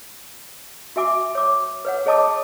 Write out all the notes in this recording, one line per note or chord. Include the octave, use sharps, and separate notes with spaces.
F#4 E5 G#5 D6
C#5 D6
B4 C#5 F#5
G#4 C#5 D#5 A5 D6 D#6